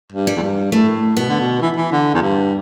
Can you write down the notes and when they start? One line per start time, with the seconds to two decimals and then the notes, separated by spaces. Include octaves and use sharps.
0.12 G2
0.27 G3
0.36 E2
0.42 G2
0.72 A2 A3
1.17 B2 B3
1.29 D3
1.40 B2
1.62 E3
1.77 E3
1.92 D3
2.14 E2
2.22 G2